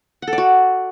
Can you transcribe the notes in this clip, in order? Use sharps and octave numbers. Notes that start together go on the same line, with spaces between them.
F#5
A4
D5
F#4